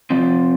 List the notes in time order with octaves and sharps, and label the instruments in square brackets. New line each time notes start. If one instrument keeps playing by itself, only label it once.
[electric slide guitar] C3 F3 C4